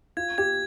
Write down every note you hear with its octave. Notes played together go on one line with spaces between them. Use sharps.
F4 G#6
G4 G#6